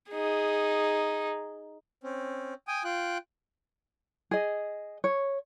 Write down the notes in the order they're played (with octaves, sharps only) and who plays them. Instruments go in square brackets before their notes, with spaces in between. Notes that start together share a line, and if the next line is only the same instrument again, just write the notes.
[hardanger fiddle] D#4 G#4
[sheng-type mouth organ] C4 C#4
G5 G#5 D#6
F4 G5 F#6
[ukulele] G#4 D#5
C#5